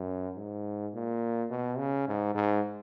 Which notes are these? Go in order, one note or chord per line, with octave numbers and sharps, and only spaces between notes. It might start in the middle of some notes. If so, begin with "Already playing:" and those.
Already playing: F#2
G#2
A#2
B2
C#3
G#2
G#2